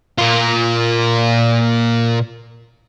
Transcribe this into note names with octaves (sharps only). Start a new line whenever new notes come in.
A#2 F4